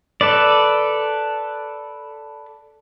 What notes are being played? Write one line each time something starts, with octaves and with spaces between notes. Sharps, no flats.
A4 B4 D5